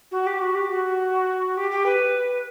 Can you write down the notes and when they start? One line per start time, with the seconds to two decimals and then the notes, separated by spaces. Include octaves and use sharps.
0.11 F#4
0.26 G4
0.41 F#4
0.55 G4
0.70 F#4
1.57 G4
1.71 G4
1.85 B4